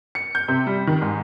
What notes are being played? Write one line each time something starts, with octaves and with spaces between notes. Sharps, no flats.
C#7
G6
C3
G3
D#3
G#2